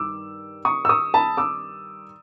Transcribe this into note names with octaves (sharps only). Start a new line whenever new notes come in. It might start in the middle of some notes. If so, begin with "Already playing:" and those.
Already playing: G2 D#3 D6 E6
C#6 D#6
E6
C#6 D#6
A5 B5
D6 E6